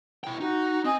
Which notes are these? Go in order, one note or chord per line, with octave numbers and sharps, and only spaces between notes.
E4 G5
D#4 F#4
C4 D#5 G#5 D#6